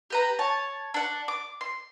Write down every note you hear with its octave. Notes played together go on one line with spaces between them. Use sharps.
G4 B4 A#5
C#5 A5
D4 F#5
D6
C6